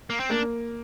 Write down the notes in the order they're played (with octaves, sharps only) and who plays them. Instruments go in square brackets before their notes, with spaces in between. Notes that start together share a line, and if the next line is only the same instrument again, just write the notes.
[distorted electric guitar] A#3
C4
[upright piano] A#3 [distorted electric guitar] D4